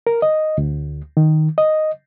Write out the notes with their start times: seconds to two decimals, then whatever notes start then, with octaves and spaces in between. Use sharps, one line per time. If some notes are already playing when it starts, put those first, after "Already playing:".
0.07 A#4
0.22 D#5
0.58 D2
1.17 D#3
1.58 D#5